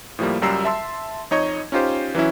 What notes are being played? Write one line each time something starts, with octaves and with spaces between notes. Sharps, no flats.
A2 F3 G3 A#3
C#2 F#2 G3 A#5 E6 C7
E5 A5 C6 E6
F2 D#4 C#5 D#5 C#6 G#6
C#4 D#4 F4 G4 C5
E3 F#3 C#4 E4